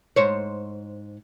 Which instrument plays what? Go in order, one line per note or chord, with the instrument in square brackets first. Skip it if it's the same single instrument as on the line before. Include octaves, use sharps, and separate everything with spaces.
[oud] G#2 C5 C#5